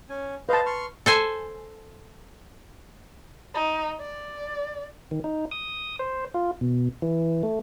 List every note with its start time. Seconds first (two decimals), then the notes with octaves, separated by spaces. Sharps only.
0.09 C#4 G#5
0.49 B4 C5 D#5 F5 A5
0.66 C6 C#6 F6
1.06 A4 C5 G#5
3.54 D#4
4.00 D5
5.11 D#3
5.24 D#4
5.51 D#6
5.99 C5
6.34 F4
6.61 B2
7.02 E3
7.43 A3